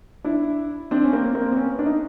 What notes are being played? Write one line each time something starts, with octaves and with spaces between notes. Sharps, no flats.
D4 E4
C4 D4
C#4
A#3 C4
A#3 C4
C4
B3 C#4
D4
D#4